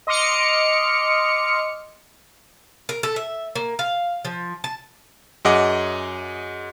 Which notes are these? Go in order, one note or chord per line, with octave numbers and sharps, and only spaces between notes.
D#5 C6 D6 F6 C#7
A#4
A4
E5
A#3
F5
F3
A5
F#2 G#4 D#5 F#5 D6